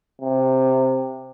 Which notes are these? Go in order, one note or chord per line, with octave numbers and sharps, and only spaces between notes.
C3